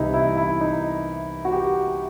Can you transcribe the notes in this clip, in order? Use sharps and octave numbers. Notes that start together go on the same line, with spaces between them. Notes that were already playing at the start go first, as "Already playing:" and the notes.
Already playing: C2 C3 E3 G3 D#4 E4 G4
E4
E4
D#4
F#4
G4